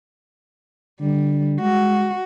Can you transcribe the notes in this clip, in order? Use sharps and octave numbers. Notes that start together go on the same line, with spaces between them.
D3 G3
G#3 F#4